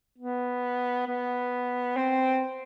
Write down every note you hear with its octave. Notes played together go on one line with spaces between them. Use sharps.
B3
B3
C4